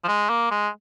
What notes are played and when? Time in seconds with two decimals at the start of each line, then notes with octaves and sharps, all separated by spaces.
0.04 F3
0.08 G#3
0.30 A#3
0.51 G#3